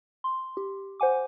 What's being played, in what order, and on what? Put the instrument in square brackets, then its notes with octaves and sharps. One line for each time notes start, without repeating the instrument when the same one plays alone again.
[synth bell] C6
G4
C5 F#5 G#5 D6